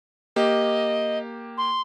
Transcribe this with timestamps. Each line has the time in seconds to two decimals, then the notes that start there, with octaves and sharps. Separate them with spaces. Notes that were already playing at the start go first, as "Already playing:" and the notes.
0.36 A#3 G4 D#5
1.57 C6